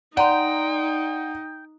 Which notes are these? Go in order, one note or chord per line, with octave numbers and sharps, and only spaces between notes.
D#4 D5 F#5 G5 A#5 C6